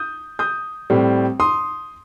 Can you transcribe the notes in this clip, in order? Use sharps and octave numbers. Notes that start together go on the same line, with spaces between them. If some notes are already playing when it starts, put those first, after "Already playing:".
Already playing: D#6 G6
D#6 G6
A2 G3 C4
C6 D#6